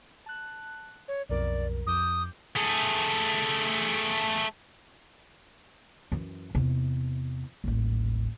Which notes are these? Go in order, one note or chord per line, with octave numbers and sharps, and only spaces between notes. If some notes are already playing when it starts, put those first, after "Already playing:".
A5 F#6
C#5
B1 F2 A#4 D5
F2 D6 D#6 G6
A3 G#4
F#2 E3
E2 C3
D#1 A1